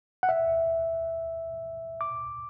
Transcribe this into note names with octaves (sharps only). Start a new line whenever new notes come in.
F#5
E5
D6